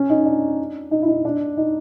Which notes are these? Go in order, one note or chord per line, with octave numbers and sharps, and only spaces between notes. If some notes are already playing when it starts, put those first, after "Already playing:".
Already playing: C#4
D#4
D4
D#4
E4
D#4
D4
D#4